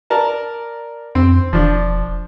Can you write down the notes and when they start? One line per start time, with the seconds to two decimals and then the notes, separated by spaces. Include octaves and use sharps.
0.10 A#4 D5 A5
1.15 F2 C4
1.53 E1 F3 D4